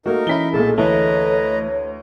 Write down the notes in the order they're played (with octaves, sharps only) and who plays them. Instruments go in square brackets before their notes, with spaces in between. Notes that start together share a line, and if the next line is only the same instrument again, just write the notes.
[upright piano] A3 A#3 F#4 [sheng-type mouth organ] D#4 A#4
[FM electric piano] E3 C#4 E4 [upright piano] B6 G7
[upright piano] B1 A#2 A3 [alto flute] G#4 [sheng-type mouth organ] A4 A5
[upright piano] D2 [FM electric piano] E3 A3 [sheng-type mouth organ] B4 D#5 A#5 [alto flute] C#5